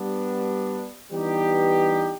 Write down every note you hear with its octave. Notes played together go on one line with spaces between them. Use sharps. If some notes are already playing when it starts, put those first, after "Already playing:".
Already playing: G3 B3 D4
E3 G3 B3 D#4 G4